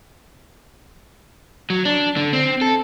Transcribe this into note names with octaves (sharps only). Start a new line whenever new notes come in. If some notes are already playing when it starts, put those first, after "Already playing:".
F#3
D4
D3
C4
A4